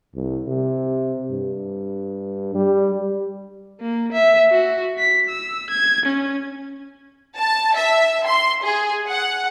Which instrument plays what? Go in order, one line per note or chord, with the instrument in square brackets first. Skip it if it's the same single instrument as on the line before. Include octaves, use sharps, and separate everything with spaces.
[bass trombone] C2
C3
G2
G3
[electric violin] A#3
E5
F#4
B6
E6
G#6
C#4
[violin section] A5
E5
C6
G#4
F#5